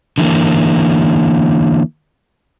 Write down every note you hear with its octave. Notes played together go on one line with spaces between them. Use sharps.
D3 E3 A#3